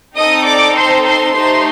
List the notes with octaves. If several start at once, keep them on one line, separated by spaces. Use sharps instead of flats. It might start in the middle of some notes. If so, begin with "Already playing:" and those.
C4 D#4 A4 D#5 D#6
D5 D6
C5 C6
C5 C6
A3 D#4 G4 C5 C6